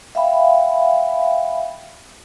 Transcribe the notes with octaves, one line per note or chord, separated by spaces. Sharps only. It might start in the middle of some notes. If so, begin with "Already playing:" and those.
E5 F5 G5 B5